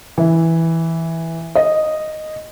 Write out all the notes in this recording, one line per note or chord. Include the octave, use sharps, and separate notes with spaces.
E3
D#5